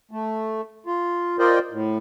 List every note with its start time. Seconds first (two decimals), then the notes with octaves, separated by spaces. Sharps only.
0.11 A3
0.86 F4
1.39 F4 A#4 C5 D5 D#5 G5
1.72 A2